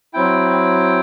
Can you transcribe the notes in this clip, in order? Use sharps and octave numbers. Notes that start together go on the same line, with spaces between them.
F#3 C4 E4 G5
G5